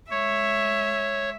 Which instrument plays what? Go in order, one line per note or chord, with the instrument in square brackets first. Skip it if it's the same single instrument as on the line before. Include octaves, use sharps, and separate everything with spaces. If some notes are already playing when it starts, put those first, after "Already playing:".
[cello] G#3 E5 [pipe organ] C#5